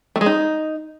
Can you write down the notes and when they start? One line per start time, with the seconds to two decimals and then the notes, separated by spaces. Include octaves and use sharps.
0.16 A3
0.21 G#3
0.26 D#4